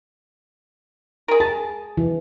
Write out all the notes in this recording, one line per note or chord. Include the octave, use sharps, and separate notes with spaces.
G#4 A#4
G#4 A5
E3